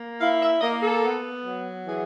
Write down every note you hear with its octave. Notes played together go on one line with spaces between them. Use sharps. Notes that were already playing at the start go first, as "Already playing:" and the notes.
Already playing: A#3
E4 F5
E5
A#3 D#5
A4
B3
F#3
E3 G#4